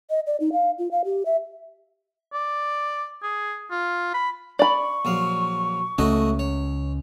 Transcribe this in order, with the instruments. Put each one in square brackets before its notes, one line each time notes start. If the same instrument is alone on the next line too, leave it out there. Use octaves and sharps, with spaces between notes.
[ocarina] D#5
D5
D#4
F5
F4
F5
G4
E5
[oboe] D5
G#4
F4
B5
[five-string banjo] D5 B5 [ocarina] C#6
[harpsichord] A#1 F#3 F5
[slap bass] C#2 C#4 [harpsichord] A3 F#4 D#5
[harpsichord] C#5